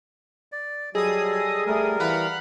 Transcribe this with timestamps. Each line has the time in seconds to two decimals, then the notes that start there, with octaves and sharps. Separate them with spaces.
0.52 D5
0.95 F#3 G3 G#4 A4 D#5 D#6
1.67 G3 A3 A#4
2.00 E3 F5 F#5 B5